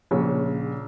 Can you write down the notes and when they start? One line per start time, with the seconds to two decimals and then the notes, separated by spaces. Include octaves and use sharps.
0.11 A#1 C#3 C#5